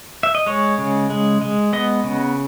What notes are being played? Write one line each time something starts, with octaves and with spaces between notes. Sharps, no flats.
E5
D#5
G#3 C#5
C#3
G#3
G#3
B3 D#5
C#3